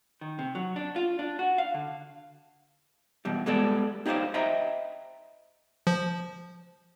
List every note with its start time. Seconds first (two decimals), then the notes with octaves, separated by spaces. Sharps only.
0.21 D#3
0.39 C3
0.55 F#3
0.76 D4
0.96 F4
1.19 D4
1.39 F#4
1.58 F5
1.74 D3
3.25 B2 E3 G3
3.46 G3 G#3 B3 A4 D5
4.06 D#4 G4 G#4 C5 D5 F5
4.34 C5 D#5 E5 G5 A#5 B5
5.87 F3